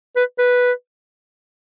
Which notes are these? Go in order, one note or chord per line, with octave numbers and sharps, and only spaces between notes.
B4
B4